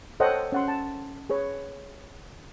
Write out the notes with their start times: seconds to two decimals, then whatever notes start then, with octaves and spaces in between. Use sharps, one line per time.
0.20 A4 C5 C#5 D#5 F#5 G5
0.52 C#4 F#5 C6
0.68 A5
1.30 G#4 B4 C#5